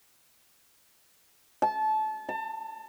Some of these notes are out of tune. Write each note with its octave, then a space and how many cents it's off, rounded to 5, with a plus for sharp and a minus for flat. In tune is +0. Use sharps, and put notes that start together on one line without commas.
A5 -25
A5 +30